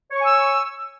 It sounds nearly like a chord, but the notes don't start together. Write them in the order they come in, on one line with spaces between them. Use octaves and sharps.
C#5 C#6 G#5 E6